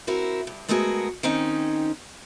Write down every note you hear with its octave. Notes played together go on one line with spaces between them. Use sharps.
C4 E4 F#4 A#4
G2
G#3 A3 B3 F#4 G#4 A#4
D#3 C4 C#4 D#4